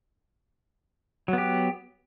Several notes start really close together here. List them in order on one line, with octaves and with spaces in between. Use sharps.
F#3 B3 G4